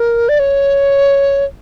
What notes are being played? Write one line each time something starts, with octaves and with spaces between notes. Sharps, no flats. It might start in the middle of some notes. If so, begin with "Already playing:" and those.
Already playing: A#4
D5
C#5